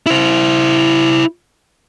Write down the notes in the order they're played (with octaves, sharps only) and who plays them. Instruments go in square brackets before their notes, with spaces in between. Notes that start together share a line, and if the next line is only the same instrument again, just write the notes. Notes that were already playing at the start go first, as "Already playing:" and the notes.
[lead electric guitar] E4 C5